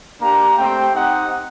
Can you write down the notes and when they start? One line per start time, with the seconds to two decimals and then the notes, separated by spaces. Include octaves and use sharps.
0.20 A#3 D4 G4 A#5
0.57 A3 C4 G4 G5
0.94 C4 D#4 G4 F#5